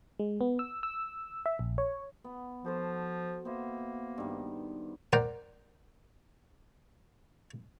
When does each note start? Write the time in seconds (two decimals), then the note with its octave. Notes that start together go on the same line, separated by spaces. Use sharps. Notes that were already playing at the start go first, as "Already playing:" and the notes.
0.19 G#3
0.41 B3
0.59 E6
0.83 E6
1.46 E5
1.59 A#1
1.78 C#5
2.24 B3
2.65 F3 F#4 A4 C5
3.45 A#3 B3 C5 E5
4.18 G2 D#3
5.13 A#4 C5 D5 F#5 G5 A#5